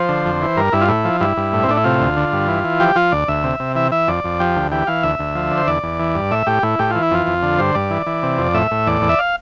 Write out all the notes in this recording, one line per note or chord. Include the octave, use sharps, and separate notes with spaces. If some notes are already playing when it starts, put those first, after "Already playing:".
Already playing: F3 C5
D3
F2
E3
G2 A#4
G2 E4
F4
A2 E4
F3
G2 E4
G2
A2
C4
A2 D4
E4
C3 F4
D2
D3
G2
E3
E3
F3 G4
F3 F4
D2 D5
D2 E5
C3
C3
E3 E5
E3 E5
F2 D5
F2
F3 G4
D2
E3 G4
E3 F5
D2 E5
D2
F3
D3
C5
E2 D5
E2
E3
G2
A2 E5
A2 G4
A2 E4
A2 G4
E3 F4
E4
F2 F4
F2
D3
G2 C5
G2 D5
E3
E3
C3
F2
A2 E5
A2
E2 D5
E2
E5
F5